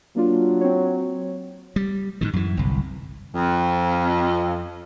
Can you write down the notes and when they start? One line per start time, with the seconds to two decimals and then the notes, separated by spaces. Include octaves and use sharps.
0.16 F#3 A#3 D4 F4
0.61 C4 C#5
1.76 G3
2.21 G#2 C3 D#3
2.33 F#2 E3
2.57 G1 C2
3.35 F2